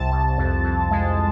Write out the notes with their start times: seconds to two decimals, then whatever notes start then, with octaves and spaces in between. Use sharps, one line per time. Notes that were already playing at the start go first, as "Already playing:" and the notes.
Already playing: C2 C3 A5
0.11 C2
0.37 F2
0.64 F2
0.91 G#3